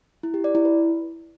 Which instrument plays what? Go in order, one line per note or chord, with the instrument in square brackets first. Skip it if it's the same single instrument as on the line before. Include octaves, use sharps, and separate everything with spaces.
[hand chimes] E4
G4
D5
E4
B4